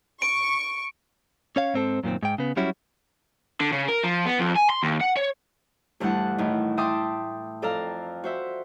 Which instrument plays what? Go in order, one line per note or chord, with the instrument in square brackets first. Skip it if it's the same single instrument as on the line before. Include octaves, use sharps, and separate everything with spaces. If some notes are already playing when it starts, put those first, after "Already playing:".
[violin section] C#6 [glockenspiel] D7
[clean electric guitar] C#4 C#5 F5
G#2 C4 A4
F#2 A#2 D#3 C4
G#2 G5
C#3 B3
F#3 G3 C#4 E4 F#4
[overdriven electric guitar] D3
C#3
A#4
F3
B3
F2
G#5
C6
D#2
F#5
C#5
[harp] D2 G2 D3 E3 F#5 A5
A2 D#3 E3
E5 G5 A5 C6 D6 D#6
F2 A4 D5 F5 A#5
F#4 C5 E5